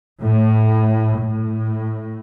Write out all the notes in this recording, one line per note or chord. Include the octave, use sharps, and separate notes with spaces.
A2
A2